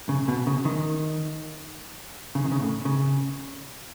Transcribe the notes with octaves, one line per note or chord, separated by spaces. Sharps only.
C#3
B2
C#3
D#3
C#3
D#3
C#3
A2
C#3